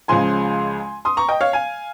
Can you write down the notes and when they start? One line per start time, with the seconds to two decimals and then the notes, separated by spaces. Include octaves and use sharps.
0.08 C#2 C#3 F3 G#3 G#5 C6
1.05 C6 D#6
1.17 A#5 C#6
1.29 D#5 G5
1.41 C#5 F5
1.53 F5 G#5